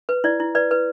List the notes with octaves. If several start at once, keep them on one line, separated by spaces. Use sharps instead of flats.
B4
E4 D5
E4
B4 D5
B4